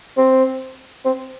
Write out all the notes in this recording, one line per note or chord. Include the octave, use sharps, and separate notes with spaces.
C4
C4